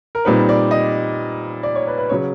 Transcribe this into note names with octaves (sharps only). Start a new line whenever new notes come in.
A#4
A#2 G3 C4 D#4 B4
D5
D#5
D5
C#5
B4
B4
C#3 F#3 C#5